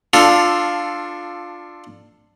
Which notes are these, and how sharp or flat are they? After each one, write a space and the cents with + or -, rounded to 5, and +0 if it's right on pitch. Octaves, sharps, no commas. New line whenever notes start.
D4 +15 F4 +5 A4 +0